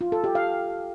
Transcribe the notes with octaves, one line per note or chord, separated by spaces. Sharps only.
F4
A4
G4
F5